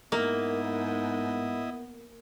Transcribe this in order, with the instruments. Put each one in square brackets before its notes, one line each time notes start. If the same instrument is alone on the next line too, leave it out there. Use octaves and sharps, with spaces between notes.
[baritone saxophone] G#2 [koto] A#3 [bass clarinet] B3 [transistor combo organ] E4 D#5